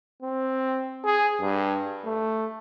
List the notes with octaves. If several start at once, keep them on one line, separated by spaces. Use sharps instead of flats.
C4
G#4
G2
A3